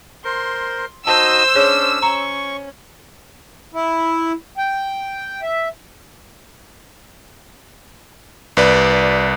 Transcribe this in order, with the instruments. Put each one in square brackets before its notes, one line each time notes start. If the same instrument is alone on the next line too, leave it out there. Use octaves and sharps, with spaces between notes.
[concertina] A#4 C5 [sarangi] C6
[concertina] D#4 F#4 D#5 [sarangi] C5 [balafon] A5 [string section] E6
[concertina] C#4 D4 [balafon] G#4 C#5
[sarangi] C#4 [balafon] A#5 [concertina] C#6
[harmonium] E4
G5
E5
[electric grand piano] C2 B4 D5